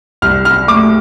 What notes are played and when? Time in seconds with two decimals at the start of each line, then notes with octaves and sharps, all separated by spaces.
0.22 C2 F6
0.45 F6
0.68 A3 D6